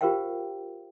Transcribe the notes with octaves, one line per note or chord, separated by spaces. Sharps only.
F4 G4 A#4 C5 F5 G5